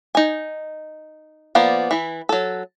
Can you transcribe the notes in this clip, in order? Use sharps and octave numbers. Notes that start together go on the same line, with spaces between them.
D#4 G#5
F3 A#3 B3 D5 A#5
E3 E4
F#3 A4